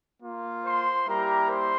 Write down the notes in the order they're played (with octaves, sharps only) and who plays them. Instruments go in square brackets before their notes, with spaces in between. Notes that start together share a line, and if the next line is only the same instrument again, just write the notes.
[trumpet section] A#3 F4
C5 C6
G3 A#3 E4 G4 A#4 A#5
C5 C6